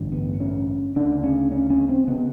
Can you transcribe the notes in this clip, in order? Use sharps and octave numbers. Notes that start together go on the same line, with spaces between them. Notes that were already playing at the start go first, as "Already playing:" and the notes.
Already playing: A1 G2 D3
B3
C#4
D2 C#3 D4
C#4
C#4
C#4
C4
C#3 B3